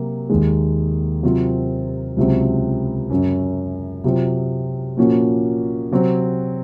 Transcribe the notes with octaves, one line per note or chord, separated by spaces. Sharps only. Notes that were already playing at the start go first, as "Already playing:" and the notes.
Already playing: C3 F#3 A#3
D#2 D#3 G#3
C3 F#3 C4 F4 C5
C#2 C3 F#3 C4
F#2 C#3 F#3
C3 F#3 C4 F4
A#2 F3 A#3 C#4 F#4
C3 F#3 C4